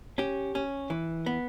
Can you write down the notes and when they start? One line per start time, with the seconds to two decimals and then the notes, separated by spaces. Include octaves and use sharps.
0.18 C#4 G4
0.55 C#4
0.90 E3
1.26 B3